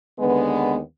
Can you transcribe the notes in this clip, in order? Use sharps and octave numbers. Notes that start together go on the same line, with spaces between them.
D#2 D3 G#3 B3